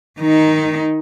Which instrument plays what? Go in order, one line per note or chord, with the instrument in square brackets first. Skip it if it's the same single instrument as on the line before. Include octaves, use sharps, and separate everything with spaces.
[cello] D#3 D#4